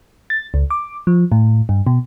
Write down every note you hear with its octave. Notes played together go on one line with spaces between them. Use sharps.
A6
C#2
D6
F3
A2
G2
B2